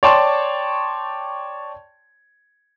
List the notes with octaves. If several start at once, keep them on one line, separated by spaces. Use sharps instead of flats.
C#5 D5 G5 A5 C6 C#6